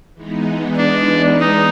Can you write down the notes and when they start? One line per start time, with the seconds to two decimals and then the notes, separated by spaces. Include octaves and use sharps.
0.14 E3 G#3 B3 D#4
0.77 D4
1.40 D#4